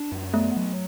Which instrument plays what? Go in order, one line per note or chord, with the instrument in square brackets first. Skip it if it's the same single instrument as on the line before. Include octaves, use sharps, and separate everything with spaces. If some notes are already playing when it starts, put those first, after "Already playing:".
Already playing: [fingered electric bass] D4
F#2
[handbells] A3 [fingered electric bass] B3
[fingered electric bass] F#3